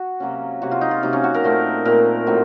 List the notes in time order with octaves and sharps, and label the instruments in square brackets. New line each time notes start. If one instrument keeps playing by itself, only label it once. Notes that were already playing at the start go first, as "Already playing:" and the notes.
Already playing: [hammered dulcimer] F#4
C3 F#3 A#3 C#4
C3 F#3 A#3 F#4
F4
D#4
F4
C3 F#3 A#3 D#4
C#4
F#4
A#4
A#2 A3 C4
A#2 A3 C4 A#4
A2 F#3 C4